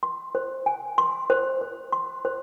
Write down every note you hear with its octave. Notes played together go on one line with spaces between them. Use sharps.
C6
C5
G#5
C6
C5
C5
C6
C5